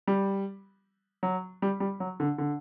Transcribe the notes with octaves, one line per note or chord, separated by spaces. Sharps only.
G3
F#3
G3
G3
F#3
D3
D3